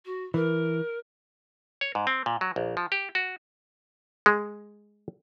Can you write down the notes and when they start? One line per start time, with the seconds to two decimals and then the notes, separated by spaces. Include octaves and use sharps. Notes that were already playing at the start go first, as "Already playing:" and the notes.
0.05 F#4
0.34 E3 A#4
1.81 C#5
1.95 G#2
2.07 C4
2.26 A#2
2.41 F#3
2.56 A#1
2.77 F3
2.92 G4
3.15 F#4
4.26 G#3